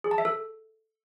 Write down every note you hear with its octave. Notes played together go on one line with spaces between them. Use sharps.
G#4
A5
E5
A4